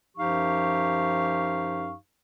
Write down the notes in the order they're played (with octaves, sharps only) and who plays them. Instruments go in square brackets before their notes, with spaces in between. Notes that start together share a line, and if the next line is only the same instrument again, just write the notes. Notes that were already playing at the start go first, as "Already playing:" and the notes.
[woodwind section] F#2 F3 D#4 G4 F5 C#6